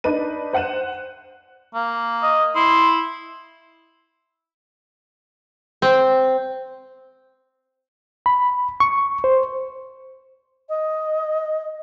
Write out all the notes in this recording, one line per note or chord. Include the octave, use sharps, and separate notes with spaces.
D4 D#4 B4 D#7
C5 F#5 F#6 D#7 E7
A#3
D#5
E4 C6
C4
B5
C#6
C5
D#5